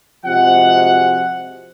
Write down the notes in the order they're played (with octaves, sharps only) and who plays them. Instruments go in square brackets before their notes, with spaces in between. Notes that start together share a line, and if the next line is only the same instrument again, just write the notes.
[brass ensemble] C3 F3 G#3 F#4 F#5